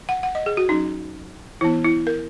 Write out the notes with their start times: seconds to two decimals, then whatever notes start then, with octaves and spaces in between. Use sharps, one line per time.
0.09 F#5
0.23 F#5
0.35 D#5
0.46 G#4
0.57 F#4
0.69 F#3 C#4 D#4
1.61 E3 B3 E4
1.84 E4
2.07 A#4